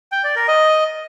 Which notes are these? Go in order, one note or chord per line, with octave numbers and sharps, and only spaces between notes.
G5
D5
A#4
D#5